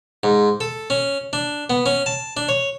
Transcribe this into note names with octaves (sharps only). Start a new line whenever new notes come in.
G#2
A4
C#4
D4
B3
C#4
A5
D4
C#5